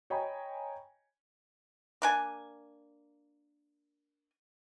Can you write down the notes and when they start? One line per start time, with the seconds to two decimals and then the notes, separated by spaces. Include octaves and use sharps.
0.10 C#5 D#5 G5 G#5 A#5 B5
2.02 A#3 D4 G#5